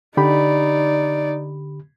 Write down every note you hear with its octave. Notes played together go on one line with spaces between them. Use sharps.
D3 D#4 G4 D5 B5